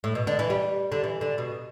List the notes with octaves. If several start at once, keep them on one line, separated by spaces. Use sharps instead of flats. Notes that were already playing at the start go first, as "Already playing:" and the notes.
A2
B2
D3
E3
G3
D3
E3
D3
B2